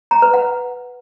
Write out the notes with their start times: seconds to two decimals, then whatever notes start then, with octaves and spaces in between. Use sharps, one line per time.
0.11 A#5
0.22 B4
0.34 F#5